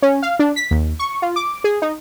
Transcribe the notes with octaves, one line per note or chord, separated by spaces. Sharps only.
C#4
F5
D4
B6
D#2
C#6
F4
D6
G#4
D#4